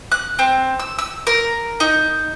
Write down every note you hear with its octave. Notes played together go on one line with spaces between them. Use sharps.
F#6
C4
E6
E6
A#4
D#4